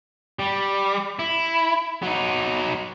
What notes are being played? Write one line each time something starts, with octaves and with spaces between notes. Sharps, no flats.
G3
E4
F#3 D#4